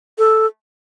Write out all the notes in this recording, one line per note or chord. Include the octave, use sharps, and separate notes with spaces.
A4